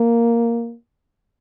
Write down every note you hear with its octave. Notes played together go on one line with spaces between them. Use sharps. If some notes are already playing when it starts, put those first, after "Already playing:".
Already playing: A#3